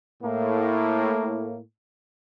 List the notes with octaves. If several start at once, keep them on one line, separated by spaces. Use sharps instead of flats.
A2 A#3